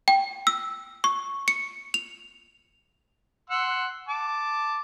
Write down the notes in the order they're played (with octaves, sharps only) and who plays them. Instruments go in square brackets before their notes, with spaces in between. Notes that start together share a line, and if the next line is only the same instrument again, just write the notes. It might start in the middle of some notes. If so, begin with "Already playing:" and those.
[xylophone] G5
E6
C#6
C#7
F7
[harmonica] F#5 C6 E6
A5 D6